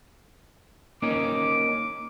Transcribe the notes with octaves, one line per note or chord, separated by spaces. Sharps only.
A#3 C#4 D#4 D6